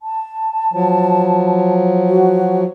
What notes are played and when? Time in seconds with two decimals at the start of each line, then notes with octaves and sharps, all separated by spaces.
0.01 A5
0.73 F3 F#3
2.06 F#4